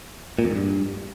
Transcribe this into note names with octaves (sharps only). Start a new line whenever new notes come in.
A#2
F2
G#2
G2